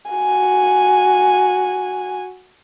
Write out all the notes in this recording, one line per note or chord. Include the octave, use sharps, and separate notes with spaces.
F#4 G#5